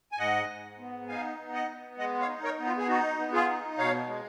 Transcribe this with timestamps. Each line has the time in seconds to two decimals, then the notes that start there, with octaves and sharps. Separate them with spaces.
0.12 G#5
0.18 G#2 D#5 F#5
0.48 G#2
0.78 B3
1.08 D#4 F5 G#5
1.38 B3
1.53 D#5 F#5
1.68 B3
1.98 G#3 D#5 F#5
2.20 C#5 F5
2.28 D#4
2.44 A#4 C#5
2.58 B3
2.66 F4
2.78 G#4
2.87 D#4 F#4
3.18 B3
3.33 F4 G#4
3.48 D#4
3.78 B2 C#5 F5
4.07 G#3